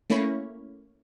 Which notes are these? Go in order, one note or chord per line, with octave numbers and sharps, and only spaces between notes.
A3 A#3 C#4 E4 C#5 B5